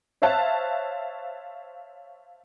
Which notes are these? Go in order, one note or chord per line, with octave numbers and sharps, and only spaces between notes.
C5 C#5 E5 F5 A5 F#6